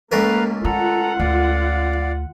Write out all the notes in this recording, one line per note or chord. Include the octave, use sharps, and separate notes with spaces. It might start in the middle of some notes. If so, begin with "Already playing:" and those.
C#2 A3 A#3 A#4 B4 F5 A#5
D4 F4 A4 F#5 A#5
D2 D5 F5